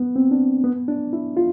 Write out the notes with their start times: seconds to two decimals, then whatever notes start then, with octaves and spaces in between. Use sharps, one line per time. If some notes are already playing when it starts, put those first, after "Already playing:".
Already playing: B3
0.16 C4
0.31 D4
0.64 B3
0.88 D4
1.13 E4
1.37 F4